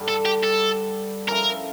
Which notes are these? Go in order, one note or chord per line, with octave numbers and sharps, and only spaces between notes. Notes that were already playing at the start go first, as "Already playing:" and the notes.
Already playing: G2 D3 G3
A4
G4
A4
F3 C#4 E4 A4 A#4